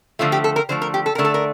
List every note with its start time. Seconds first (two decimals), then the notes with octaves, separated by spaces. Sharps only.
0.19 D3 F3 A3 F4
0.32 G4
0.44 A4
0.56 A#4
0.69 D3 F3 A3 C5
0.82 A#4
0.94 G4
1.06 A4
1.15 D3 A3 A#4
1.25 A4
1.34 A#4